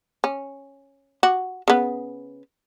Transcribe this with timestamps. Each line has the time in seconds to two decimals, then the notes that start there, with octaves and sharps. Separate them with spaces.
0.24 C#4
1.23 F#4
1.68 C#3 B3